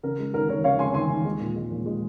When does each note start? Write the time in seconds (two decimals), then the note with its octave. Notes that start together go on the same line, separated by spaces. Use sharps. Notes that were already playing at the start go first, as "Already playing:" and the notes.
0.03 C#3 A#4
0.19 G#3
0.34 D#2 A#4
0.49 D#2 A#4 C#5
0.64 C#3 C#5 F5
0.79 G#3 G#5 C6
0.94 D#2 G#5 C6
1.10 D#2
1.25 G#3
1.40 A#2
1.55 G#3
1.71 A#2
1.86 G#3